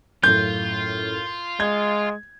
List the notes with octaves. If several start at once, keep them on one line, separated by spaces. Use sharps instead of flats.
F#2 A2 F4 G6
G#3 G#6